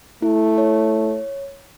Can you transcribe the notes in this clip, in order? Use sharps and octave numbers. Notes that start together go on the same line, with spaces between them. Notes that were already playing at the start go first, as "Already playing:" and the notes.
A3 E4
C#5